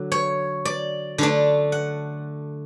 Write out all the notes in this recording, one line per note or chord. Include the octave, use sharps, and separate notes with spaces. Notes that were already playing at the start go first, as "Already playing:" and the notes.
Already playing: D3 F#3
C#5
D5
D3 A3 D4
F#5